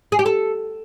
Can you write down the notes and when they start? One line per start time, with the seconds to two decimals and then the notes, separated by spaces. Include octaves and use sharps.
0.12 G#4
0.19 G4
0.26 A4